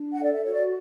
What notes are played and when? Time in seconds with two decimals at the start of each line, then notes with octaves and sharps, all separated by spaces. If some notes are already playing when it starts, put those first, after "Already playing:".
Already playing: D4
0.13 F#5
0.19 A4 D5
0.33 E5
0.45 F#4 C#5
0.52 D5